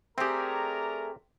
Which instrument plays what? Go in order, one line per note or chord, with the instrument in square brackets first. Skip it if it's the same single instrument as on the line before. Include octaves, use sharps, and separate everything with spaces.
[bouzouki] A3 G#4 [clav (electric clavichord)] C4 G4 [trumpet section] A#4 D5 A#5